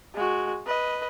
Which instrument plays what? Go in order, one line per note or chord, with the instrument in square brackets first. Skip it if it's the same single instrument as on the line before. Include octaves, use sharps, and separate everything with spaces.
[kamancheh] G#3 F#4
B4 D#5